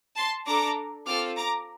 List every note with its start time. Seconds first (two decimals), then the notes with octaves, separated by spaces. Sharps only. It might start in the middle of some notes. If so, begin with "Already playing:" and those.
0.18 A5 C6
0.47 D4 A4 A#5 D6
1.07 C4 F4 A4 D6 F6
1.37 A#5 D6